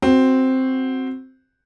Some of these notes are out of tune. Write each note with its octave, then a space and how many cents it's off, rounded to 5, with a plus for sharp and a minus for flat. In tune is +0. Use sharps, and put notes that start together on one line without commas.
C4 +0 F#4 +0